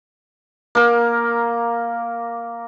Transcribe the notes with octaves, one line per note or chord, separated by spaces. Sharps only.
A#3 A#4